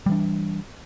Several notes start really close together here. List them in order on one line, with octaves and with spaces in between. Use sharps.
G3 E3 D4